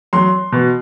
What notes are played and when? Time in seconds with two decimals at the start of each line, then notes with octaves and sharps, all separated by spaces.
0.13 F#3 C6
0.52 B2